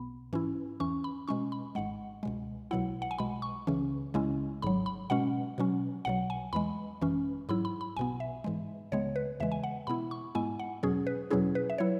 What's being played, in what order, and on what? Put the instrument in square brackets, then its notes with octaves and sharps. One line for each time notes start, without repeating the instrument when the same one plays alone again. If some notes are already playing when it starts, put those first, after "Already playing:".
Already playing: [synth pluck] B1 B2 B3 B5
G#2 E3 C#4 E4
E2 E3 C#4 C#6
B5
B2 G#3 C#4 C#6
B5
G#1 G#2 G#3 F#5
C#2 B2 G#3
B1 B2 F#3 E4 F#5
F#5
G#5
B1 B2 G#3 B5
C#6
C#2 C#3 E3 C#4
C#2 C#3 G#3 C#4 E4
G#1 G#2 F#3 B5
B5
B2 G#3 C#4 F#5
B2 F#3 C#4
B1 B2 F#3 F#5
G#5
E2 E3 G#3 B5
G#1 F#2 E3 C#4
G#2 F#3 E4 B5
B5
B5
B1 B2 B3 G#5
E5
G#2 E3 G#3
C#2 C#3 G#3 B3 C#5
B4
E2 C#3 E3 G#3 E5
G#5
F#5
B2 B3 E4 B5
C#6
G#2 G#3 B3 E4 G#5
F#5
E2 B2 F#3 C#4 G#4
B4
E2 B2 F#3 C#4 E4 G#4
B4
E5
F#3 E4 C#5